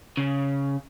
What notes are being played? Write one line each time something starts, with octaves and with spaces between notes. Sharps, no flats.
C#3